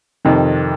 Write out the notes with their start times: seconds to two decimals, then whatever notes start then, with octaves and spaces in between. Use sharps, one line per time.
0.25 F2 C3 D#3